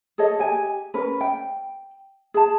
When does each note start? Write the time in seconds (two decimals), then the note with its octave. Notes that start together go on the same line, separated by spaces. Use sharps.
0.18 G#4 A4 C#5 D#5
0.39 G4 G#5
0.94 C#4 A#4 B4
1.21 G5
2.34 G#4 A5